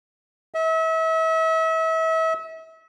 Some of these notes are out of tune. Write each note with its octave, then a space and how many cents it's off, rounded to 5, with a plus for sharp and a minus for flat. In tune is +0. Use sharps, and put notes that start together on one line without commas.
E5 -35